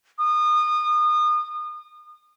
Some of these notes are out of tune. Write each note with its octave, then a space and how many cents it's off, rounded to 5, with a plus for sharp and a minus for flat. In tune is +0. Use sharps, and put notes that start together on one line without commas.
D#6 -30